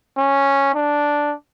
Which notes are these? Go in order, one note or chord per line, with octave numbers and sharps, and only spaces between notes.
C#4
D4